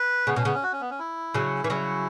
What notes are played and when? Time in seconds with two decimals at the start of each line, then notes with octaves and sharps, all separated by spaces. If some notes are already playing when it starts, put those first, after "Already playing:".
Already playing: B4
0.27 C#3 B3
0.36 B2 C#4
0.45 C#3 B3
0.54 C#4
0.63 F#4
0.72 C#4
0.81 B3
0.90 C#4
0.99 E4
1.34 C#3 F#3
1.64 E3 C#4
1.70 C#3 F#3 E4